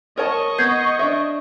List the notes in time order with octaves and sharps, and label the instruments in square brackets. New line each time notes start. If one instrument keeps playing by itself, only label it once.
[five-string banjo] A#4 C#5 A5 [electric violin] D#5 C#6
[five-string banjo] B3 [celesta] G6 G#6 C7
[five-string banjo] D4 E5